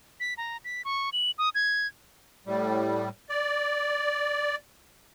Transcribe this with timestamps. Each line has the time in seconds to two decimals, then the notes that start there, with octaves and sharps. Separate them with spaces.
0.20 B6
0.37 A#5
0.65 B6
0.85 C#6
1.13 F#7
1.38 D#6
1.55 G#6
2.46 A2 G3
3.29 D5